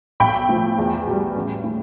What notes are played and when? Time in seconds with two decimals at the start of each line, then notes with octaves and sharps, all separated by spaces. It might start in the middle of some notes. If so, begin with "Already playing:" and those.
0.20 B1 G5 B5
0.49 A2 F3
0.78 E2
1.07 B2 G3
1.36 A1
1.64 A2